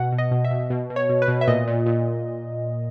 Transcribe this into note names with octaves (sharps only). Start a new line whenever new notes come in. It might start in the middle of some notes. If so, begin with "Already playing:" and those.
Already playing: B2 F#5
B2
D#5
B2
E5
B2
B2
B2
C#5
B2
B4
B2
E5
A#2 D#5
A#2
A#2